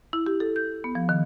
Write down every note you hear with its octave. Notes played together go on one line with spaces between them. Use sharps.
E4
G4
A4
G6
B3
F3
D#3